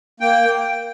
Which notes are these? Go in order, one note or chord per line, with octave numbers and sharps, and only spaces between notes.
A#3 G5